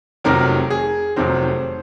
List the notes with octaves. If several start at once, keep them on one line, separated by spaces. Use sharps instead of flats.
F1 F2 C3 D#3 F#3 A#4
G#4
F1 F2 C3 D#3 F#3 C5